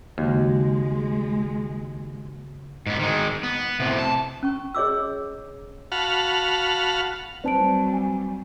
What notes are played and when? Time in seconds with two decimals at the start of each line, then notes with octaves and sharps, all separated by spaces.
0.18 D#2 C#3 G#3 F#4
2.86 G#2 B3
2.99 D#3 G#3
3.43 B3
3.80 A2 C3
3.99 A5
4.43 C#4 C#6
4.75 G#4 C#5 D#5 D6 E6
5.92 F#4 F5 F#5 A5 B5 F6
7.44 F#3 G3 C4 B4 D5 A5 D7
7.93 G#5